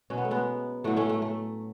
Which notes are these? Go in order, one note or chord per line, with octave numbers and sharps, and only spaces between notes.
B2 F#3 C#4
B3
A3
G#3 B3
A2 F#3 A3
A3 C#4
A3
A3